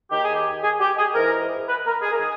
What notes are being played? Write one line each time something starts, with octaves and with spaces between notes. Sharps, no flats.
D#2 D#3 G4
G#4
G4
G#4
G4
G#4
G#2 E3 A#4
B4
A#4
G#4
A#4
D#3 G#4